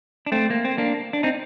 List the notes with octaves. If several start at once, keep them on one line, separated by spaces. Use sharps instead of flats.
D4
A3 C4
A#3
C4
A#3 D4
D4
C4 D#4